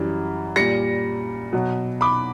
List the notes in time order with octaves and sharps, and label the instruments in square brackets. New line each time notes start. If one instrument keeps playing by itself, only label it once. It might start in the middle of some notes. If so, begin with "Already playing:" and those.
Already playing: [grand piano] F#2 E3 G3
A#2 G3 A#6 C#7
B2 F#3
B5 D6